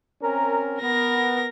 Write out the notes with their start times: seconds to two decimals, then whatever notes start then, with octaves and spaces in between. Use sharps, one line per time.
0.22 C4 C#4 A#4
0.81 B3 A#4 A#6